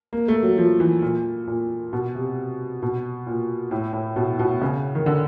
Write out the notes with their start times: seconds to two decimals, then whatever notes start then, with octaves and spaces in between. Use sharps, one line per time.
0.13 A#3
0.28 A3
0.43 F#3
0.58 F3
0.80 E3
1.02 A#2
1.47 A#2
1.93 B2
2.15 C3
2.82 B2
3.26 A#2
3.71 A2
3.93 A2
4.16 B2
4.39 B2
4.62 C#3
4.95 D#3
5.06 D3